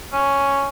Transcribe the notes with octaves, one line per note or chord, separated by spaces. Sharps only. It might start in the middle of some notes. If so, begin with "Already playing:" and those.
C#4